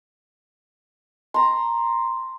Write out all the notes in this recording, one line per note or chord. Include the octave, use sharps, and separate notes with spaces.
A#5 C6